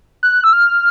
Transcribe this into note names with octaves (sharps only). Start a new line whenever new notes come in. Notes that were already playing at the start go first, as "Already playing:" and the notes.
F#6
E6
F6